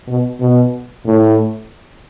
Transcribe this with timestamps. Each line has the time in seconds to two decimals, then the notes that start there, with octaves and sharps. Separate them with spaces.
0.08 B2
0.41 B2
1.06 A2